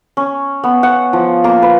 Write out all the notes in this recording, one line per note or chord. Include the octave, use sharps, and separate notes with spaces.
C#4
B3
F#5
F3
A#3
B4